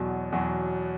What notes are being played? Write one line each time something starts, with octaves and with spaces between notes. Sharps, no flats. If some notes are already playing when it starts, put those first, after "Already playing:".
Already playing: E2 B2 F#3
E2 B2 F#3